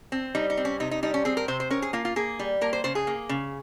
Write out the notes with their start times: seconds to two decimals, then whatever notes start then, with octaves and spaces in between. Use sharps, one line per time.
0.12 C4
0.35 G3 D#4
0.50 D#4
0.57 C4
0.65 C#4
0.80 C3 D#4
0.91 D#4
1.03 G3 D#4
1.14 C#4
1.25 C4 G#4
1.37 A#4
1.48 C3 C5
1.60 C5
1.70 C#4 A#4
1.82 G#4
1.93 A#3 F4
2.05 F4
2.16 A#3 G#4
2.39 G3
2.61 A#3 A#4
2.73 C5
2.84 C#3 C5
2.95 G#4
3.07 A#3
3.29 C#3